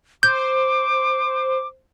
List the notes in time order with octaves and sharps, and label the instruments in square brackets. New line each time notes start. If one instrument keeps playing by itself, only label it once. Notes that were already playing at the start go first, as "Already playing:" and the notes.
[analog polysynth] C5 [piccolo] D6 [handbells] G6